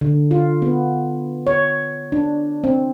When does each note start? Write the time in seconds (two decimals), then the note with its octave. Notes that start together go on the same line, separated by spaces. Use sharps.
0.01 D3
0.31 F4
0.62 B3
1.47 C#5
2.12 D4
2.64 C4